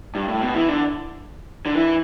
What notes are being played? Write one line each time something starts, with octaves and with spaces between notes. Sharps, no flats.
G2
A2
B2
E3
D3
D3
E3